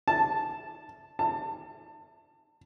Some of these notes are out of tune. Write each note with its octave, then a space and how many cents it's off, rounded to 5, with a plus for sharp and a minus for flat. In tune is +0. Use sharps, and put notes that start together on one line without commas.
A5 -5
A5 +25